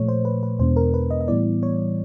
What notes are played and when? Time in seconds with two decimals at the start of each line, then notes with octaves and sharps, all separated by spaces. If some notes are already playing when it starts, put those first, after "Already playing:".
Already playing: A#2 F3 A3 C#5
0.08 C5
0.25 B4
0.43 B4
0.59 E2 B2 G#3 B3 D4 C5
0.76 A#4
0.94 B4
1.11 D#5
1.21 D#5
1.28 A2 E3 G3 B3 E4 D5
1.63 C#5